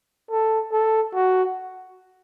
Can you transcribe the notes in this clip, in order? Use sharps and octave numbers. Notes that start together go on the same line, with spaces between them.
A4
A4
F#4